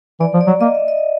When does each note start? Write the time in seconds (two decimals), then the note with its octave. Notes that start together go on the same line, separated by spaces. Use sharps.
0.20 E3 D5
0.34 F3
0.41 D5
0.47 F#3
0.61 A#3 D#5
0.75 E5
0.88 D#5